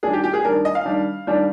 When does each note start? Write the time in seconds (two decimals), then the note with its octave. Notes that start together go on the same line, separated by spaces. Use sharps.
0.03 D#3 G3 D4 G#4
0.13 G4
0.24 G4
0.33 G#4
0.44 D#3 G3 D4 A#4
0.65 D#5
0.75 F5
0.85 D#3 G3 D4
1.27 D#3 G3 D4